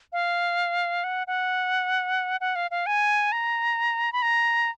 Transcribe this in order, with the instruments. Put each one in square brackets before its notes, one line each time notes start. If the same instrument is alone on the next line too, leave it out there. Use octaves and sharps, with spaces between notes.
[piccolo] F5
F#5
F#5
F#5
F5
F5
G#5
A#5
B5
A#5